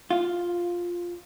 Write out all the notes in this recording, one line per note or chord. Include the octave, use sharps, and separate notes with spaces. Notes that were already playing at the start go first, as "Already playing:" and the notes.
F4